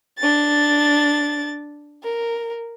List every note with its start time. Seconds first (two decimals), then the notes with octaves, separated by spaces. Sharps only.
0.19 D4 A6
2.03 A#4